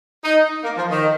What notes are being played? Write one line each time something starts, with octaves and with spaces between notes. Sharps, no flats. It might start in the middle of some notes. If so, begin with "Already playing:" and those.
D#4
A#3
F3
D#3